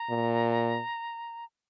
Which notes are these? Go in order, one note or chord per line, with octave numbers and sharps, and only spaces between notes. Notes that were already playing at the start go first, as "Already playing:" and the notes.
Already playing: A#5
A#2